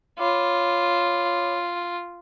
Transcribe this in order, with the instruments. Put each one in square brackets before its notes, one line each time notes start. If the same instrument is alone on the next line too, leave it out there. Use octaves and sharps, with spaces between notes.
[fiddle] F4 [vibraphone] C#5 B5 D6